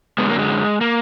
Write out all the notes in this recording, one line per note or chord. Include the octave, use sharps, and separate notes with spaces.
F#2 D3 F#3 G#3 B3
A#3
G#3
A#3